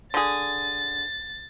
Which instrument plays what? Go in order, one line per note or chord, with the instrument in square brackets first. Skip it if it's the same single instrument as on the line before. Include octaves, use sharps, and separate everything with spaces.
[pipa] D3 G#4 [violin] A6